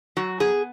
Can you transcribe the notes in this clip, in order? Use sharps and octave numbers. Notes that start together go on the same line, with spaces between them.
F#3 F#4
B3 G#4